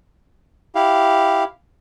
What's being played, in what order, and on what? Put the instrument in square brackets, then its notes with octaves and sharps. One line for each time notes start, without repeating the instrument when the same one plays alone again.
[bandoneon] E4 G4 F5